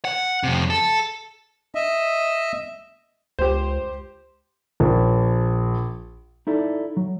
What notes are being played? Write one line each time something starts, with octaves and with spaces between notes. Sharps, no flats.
F#5
F2 C3
A4
D#5 E5
C#2 G4 C5
A#1
D#4 E4 A4 D5
F#3